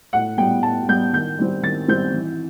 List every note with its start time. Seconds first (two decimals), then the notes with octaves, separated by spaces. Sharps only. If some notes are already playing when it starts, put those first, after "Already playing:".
0.13 A2 F#5
0.38 G3 B3 G5
0.63 A2 A5
0.89 G3 B3 G6
1.14 D#3 G6
1.39 G3 C4
1.63 D#3 A6
1.88 G3 C4 G6
2.14 E3